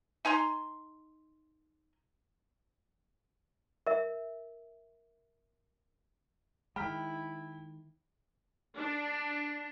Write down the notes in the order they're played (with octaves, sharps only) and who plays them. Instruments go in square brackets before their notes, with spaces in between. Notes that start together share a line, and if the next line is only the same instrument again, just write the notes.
[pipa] D#4 G#5 A#5 C6
[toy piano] A#4 E5
[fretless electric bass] D#3 G#3 [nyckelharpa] E4 [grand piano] G5 [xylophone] B5 F6 B6
[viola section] D4